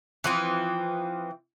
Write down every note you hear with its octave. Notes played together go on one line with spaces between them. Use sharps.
E3 F3 C4